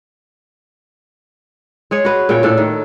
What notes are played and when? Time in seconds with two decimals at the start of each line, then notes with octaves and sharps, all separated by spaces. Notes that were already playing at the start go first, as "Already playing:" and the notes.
1.91 G#3 G#4 C#5
2.05 F#4 B4
2.29 A#2 C#3 C#5 G5
2.43 A2 D4 A4
2.57 D#3